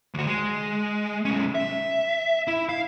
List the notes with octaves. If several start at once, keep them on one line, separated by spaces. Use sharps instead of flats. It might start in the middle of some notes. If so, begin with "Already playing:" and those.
D2 F#4
G#3
B1 C#4
E5
E4
F5